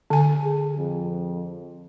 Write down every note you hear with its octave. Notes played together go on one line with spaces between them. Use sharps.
D3 G#5
G#4
F2